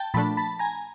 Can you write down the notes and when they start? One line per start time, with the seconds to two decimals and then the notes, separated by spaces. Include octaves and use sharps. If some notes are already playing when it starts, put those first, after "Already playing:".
Already playing: G5 A5
0.14 A#2 F3 A3 D4 A5 B5
0.37 A5 B5
0.59 G#5 A#5